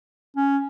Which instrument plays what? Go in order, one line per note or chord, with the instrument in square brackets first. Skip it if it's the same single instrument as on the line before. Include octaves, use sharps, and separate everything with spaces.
[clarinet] C#4